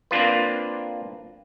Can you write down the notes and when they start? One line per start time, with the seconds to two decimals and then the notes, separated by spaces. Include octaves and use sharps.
0.11 A#3 C4 D4 F4 B4